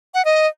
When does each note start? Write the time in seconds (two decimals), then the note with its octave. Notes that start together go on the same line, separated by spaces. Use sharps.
0.14 F#5
0.25 D#5